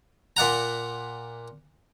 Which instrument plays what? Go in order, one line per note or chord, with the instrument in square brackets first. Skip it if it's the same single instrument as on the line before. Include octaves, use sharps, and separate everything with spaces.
[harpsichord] A#2 D5 F#5 A#5